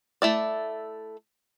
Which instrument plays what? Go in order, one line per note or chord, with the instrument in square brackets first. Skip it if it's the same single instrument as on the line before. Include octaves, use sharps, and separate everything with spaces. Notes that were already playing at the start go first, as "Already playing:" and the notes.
[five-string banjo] A3 E4 D5